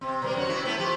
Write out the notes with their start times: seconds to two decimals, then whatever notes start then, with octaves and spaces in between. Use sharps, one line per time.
0.01 C3 C4
0.22 B2 G3 A#4
0.36 F#2 F#4 C#5
0.49 C3 E4
0.65 A3 B3 E4
0.79 F3 G4